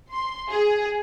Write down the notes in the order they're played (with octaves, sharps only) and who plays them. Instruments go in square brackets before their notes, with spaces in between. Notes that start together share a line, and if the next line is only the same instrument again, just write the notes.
[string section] C6
G#4